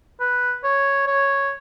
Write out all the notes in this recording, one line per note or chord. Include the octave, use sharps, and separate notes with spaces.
B4
C#5
C#5